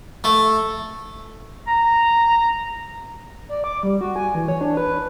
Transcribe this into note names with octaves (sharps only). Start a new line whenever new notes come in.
A3
A#5
D5
D6
G3
F#4
G#5
E3
C#5
D4
B4